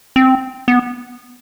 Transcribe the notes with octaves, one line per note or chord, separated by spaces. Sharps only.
C4
B3